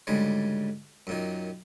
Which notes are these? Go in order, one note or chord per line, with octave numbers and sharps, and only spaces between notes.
D2 G#2 C#3 G3 G#3
F#2 A#2 D#3